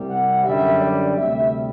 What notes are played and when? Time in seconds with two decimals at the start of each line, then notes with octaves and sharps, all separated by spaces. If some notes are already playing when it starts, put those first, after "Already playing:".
Already playing: C2 C3 G3
0.09 F#5
0.44 F#2 D3 G3 E5
0.80 D5
1.17 D2 C3 G3 E5